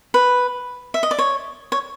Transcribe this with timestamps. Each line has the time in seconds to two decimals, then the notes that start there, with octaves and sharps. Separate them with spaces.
0.14 B4
0.94 E5
1.03 D#5
1.11 D5
1.19 C#5
1.72 C#5